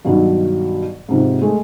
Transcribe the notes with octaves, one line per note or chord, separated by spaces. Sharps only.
G2 B2 D#3 F#3
G#2 C3 F3
G#3 A3